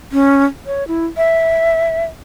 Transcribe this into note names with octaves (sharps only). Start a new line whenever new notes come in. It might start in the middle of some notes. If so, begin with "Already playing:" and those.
C#4
C#5
E4
E5